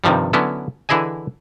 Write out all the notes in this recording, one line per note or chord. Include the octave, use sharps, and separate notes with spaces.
G2 C3 D#3 F3 G3
D3 F#3 B3 C#4 E4
D3 E3 E4 G#4 D#5 G#5